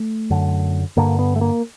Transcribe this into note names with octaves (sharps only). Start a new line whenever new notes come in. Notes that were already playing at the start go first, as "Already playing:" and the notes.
Already playing: A3
F#2 D3
G2 D3 A#3
B3
A3
A#3